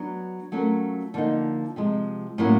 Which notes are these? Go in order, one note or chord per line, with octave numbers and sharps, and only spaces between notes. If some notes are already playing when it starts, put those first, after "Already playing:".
Already playing: F#3 B3 D4
F#3 A3 C#4 F4 A#4
D3 F3 A#3 D#4
C3 F3 G#3
A2 F#3 A#3 C#4